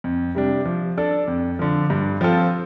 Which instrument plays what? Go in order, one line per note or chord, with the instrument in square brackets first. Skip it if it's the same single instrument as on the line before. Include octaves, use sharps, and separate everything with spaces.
[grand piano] F2
C3 G3 D4
F3
D4 A4 D5
F2
D3 F3
G2
F3 C4 F4 A4